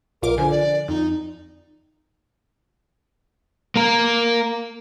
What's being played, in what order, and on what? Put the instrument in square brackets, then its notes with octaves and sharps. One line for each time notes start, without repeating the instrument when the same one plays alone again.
[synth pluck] B1 F4 D6 [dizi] A#4
[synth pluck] D3 F3 [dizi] G#5
[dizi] D5
[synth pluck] F2 [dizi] D#4
[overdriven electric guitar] A#3 A#4